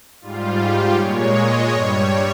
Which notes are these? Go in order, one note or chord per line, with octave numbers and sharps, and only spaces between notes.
G#2 G3 F4
G4
A#2 G#3 C#5
D#5
G2 G3 C#5